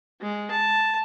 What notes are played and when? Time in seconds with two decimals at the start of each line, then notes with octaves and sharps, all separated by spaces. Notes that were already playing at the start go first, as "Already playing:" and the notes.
0.21 G#3
0.51 A5